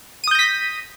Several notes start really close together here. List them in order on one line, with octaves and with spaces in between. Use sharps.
D#7 D#6 G6 A#6 B6